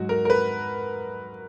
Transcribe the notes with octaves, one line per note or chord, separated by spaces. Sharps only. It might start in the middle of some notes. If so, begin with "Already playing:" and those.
Already playing: G#2 F#3 F#4
A#4
A#4
B4